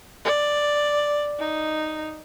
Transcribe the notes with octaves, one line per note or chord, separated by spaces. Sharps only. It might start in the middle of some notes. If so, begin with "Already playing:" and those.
D5
D#4